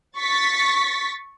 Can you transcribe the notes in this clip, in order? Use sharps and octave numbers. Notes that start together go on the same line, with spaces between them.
C#6 A6 B6